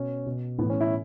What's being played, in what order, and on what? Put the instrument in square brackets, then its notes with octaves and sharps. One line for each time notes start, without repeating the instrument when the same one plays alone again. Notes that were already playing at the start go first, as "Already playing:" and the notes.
Already playing: [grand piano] B2 C#4
B2
A2 E3 B3
C#4
E4